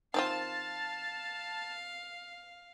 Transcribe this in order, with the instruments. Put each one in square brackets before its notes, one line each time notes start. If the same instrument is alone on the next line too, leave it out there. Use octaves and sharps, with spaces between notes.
[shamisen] D#3 C4 F4 [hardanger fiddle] F5 [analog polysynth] A5